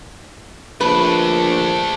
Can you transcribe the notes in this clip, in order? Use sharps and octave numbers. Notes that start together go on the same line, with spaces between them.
A#1 A3 D4 B4